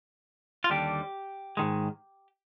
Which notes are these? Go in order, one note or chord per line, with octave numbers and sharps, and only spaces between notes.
F4
D#2 D3 G3 D4 G4
G#2 D#3 G#3